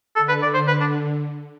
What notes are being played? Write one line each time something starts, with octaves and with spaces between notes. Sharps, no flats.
D3 A4
B4
D5
C5
B4
D4